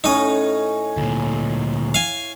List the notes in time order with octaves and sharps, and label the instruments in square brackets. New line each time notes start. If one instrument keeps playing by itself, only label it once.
[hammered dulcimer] A2 C#4 [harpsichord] D#4 D#5
[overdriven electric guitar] D2 A#2
[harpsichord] F5 G#5